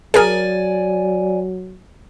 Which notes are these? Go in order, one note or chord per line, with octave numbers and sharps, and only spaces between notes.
F#3 G#4 A#4 D5 G#5